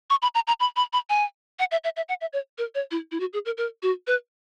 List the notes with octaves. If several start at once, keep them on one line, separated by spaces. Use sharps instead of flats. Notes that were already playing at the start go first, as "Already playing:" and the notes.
C#6
B5
A#5
A#5
B5
B5
B5
G#5
F#5
E5
E5
E5
F#5
E5
C#5
A#4
C#5
E4
E4
F#4
G#4
A#4
A#4
F#4
B4